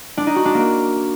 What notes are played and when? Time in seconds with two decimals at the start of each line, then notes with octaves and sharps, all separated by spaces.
0.17 D4
0.27 D#4
0.36 F#4
0.45 D4
0.54 A#3